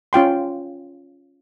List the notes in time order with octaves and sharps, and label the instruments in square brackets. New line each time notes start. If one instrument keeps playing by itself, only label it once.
[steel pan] C#4 F4 G5 C6